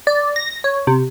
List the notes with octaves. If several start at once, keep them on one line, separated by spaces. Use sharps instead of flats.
D5
A#6
C#5
C3